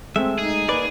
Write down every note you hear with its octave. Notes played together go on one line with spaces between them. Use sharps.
G#3 A3 C4 E5
D#4 G#4
A#3 B4 D5